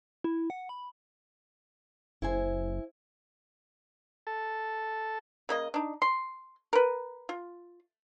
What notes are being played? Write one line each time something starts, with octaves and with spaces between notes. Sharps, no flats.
E4
F#5
B5
F#1 E4 C5 G#5
A4
C#3 A#3 D#5
D4 D#4
C6
A#4 B4
F4